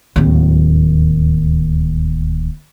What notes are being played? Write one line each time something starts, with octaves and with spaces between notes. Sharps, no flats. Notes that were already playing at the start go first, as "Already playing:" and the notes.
D1 D#2